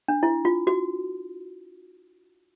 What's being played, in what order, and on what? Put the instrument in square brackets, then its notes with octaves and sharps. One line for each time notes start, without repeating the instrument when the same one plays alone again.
[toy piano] D4
E4
F4
F#4